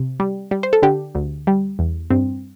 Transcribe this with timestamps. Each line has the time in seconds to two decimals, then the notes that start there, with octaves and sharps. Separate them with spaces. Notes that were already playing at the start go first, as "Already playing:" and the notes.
Already playing: C3
0.20 G3
0.51 G3
0.63 C5
0.73 A4
0.83 D3 D4 G4
1.15 D2
1.47 G3
1.79 E2
2.10 G2 C4